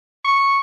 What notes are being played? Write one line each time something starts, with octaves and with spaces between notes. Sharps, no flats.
C#6